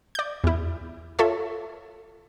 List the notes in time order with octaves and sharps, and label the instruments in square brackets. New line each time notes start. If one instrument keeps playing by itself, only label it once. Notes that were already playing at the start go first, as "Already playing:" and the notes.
[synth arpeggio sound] D5 G6
E2 E4
F4 A4 C#5 E5